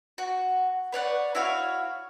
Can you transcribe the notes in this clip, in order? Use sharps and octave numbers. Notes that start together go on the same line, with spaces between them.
F#4
B4 C#5 D5 F#5
E4 F#4 C#5 F5